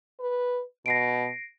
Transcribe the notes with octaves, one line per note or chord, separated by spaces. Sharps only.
B4
B2 A#6 C7 D7